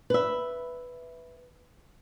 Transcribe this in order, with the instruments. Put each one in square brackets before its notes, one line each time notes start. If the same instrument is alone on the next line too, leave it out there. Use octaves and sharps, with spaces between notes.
[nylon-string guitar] B4 E5